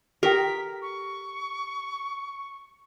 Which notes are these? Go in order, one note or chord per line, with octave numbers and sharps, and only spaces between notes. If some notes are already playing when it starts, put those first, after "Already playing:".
G4 A4 A#4 G5 B6
C#6